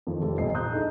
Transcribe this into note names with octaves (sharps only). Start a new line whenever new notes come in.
F2 D#3 F3
F1 G4 A4 C5
D#1 B1 F2 D#5 C7
A#5 D#6 F#6 G6
D4 D#4 G#4 A4